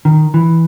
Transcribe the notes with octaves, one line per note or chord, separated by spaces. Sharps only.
D#3
E3